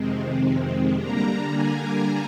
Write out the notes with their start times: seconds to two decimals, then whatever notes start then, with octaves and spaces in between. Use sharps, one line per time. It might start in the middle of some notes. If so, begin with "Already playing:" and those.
Already playing: F2 C3 D#3 G#3 C4
0.97 D3 G3 A#3 D4 A#5
1.52 G#5